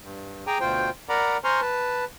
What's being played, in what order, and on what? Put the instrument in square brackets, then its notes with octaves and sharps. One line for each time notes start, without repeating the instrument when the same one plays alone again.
[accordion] G2
G#4 G5 G#5 A#5 D6
D2 B2 F4 C5 G5
A#4 D5 F#5 A#5 B5 D6
C5 G#5 A#5 C6 C#6 F6
B4 A5